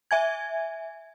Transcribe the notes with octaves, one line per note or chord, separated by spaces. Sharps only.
E5 G#5 G#6